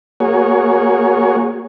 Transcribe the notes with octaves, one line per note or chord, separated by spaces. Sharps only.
A#3 F#4 G#4 C#5